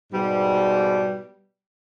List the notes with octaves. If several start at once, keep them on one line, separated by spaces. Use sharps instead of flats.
G#2 B2 G3